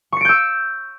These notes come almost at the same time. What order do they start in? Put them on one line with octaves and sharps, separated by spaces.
C#6 C#7 D7 G6 E6